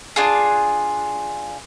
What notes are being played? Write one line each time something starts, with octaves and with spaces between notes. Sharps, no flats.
D4 F4 G#4